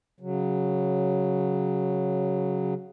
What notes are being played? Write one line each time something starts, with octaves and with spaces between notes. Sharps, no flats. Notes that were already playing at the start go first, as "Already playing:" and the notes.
C#3 F#3